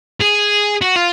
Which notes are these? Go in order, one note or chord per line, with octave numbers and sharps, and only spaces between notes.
G#4
F#4
F4